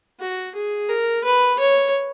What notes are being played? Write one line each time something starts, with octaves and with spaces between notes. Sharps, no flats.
F#4
G#4
A#4
B4
C#5